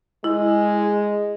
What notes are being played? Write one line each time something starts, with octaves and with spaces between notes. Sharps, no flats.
G#3 E4